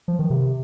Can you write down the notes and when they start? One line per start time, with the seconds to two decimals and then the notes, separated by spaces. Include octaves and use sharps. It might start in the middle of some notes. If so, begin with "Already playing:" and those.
0.08 F3
0.19 D#3
0.30 C3